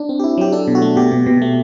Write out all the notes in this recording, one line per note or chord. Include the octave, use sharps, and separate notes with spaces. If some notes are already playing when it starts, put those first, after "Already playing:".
Already playing: D4
C4
G4
E4
F#3 G4
D4 A4
B2
F#4
A3
B2 G4
B2
B2
A3